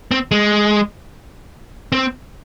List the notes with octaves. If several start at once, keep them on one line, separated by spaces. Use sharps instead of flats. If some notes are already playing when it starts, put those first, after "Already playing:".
C4
G#3
C4